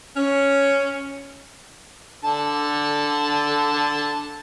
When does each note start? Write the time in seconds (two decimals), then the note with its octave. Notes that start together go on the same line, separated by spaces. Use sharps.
0.16 C#4
2.25 D3 A5